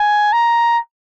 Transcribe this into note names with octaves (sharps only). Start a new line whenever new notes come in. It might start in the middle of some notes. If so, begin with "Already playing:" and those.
Already playing: G#5
A#5